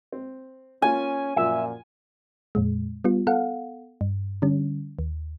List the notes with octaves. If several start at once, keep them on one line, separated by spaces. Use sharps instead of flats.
C4
A#3 C#4 F4 G#5
F#2 A#2 F3 E5
F2 A#2 G#3
G3 B3 F4
B3 A4 F5 F#5
G2
D3 G3 C#4
D#2